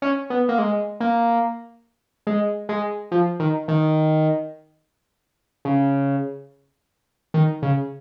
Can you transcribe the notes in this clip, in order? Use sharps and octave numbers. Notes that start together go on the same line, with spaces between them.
C#4
B3
A#3
G#3
A#3
G#3
G#3
F3
D#3
D#3
C#3
D#3
C#3